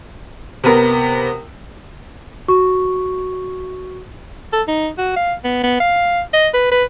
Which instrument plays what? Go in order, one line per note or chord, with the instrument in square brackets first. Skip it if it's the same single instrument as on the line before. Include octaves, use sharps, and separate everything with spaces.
[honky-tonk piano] C3 B3 A#4
[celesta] F#4 C#6
[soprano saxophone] A4
D#4
F#4
F5
B3
B3
F5
D#5
B4
B4